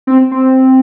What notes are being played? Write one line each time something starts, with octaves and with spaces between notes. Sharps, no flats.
C4
C4